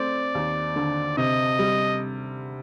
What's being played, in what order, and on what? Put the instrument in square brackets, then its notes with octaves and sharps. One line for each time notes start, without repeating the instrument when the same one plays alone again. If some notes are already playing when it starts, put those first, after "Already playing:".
Already playing: [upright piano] A3 C4 [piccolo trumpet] D5
[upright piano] D#2
D3
[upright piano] C3 [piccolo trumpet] D#5
[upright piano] G3